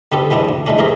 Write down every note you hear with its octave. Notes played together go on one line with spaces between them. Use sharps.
D3 B3 C4 G4 A4
E3 G#3 B3 C4 D4
D2
E3 G#3 A3 C#4 D4
A3 C4 G4 G#4 A#4